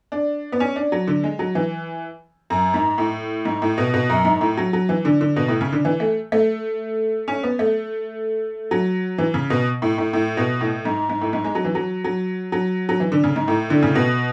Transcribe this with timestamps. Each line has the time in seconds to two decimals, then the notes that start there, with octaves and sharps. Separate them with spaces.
0.12 D4
0.52 B3
0.60 C#4
0.76 D4
0.92 F#3
1.07 D3
1.24 G#3
1.39 F#3
1.55 E3
2.50 F#2
2.74 G#2
2.98 A2
3.45 G#2
3.62 A2
3.78 B2
3.94 B2
4.10 F#2
4.25 G#2
4.41 A2
4.57 F#3
4.73 F#3
4.89 E3
5.05 D3
5.21 D3
5.36 B2
5.48 A2
5.61 C#3
5.72 D3
5.85 E3
6.00 A3
6.32 A3
7.28 C#4
7.43 B3
7.59 A3
8.71 F#3
9.18 E3
9.34 C#3
9.50 B2
9.82 A2
9.98 A2
10.13 A2
10.37 B2
10.61 A2
10.85 G#2
11.10 G#2
11.21 A2
11.33 G#2
11.44 G#3
11.55 F#3
11.64 E3
11.75 F#3
12.04 F#3
12.52 F#3
12.89 F#3
13.00 E3
13.12 D3
13.24 C#3
13.36 G#2
13.48 A2
13.70 D3
13.83 C#3
13.95 B2